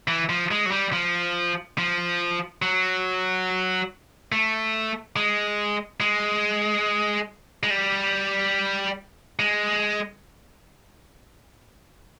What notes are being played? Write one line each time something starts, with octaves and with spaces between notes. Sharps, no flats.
E3
F3
G#3
F#3
G3
F3
F3
F#3
A3
G#3
G#3
G#3
G3
G#3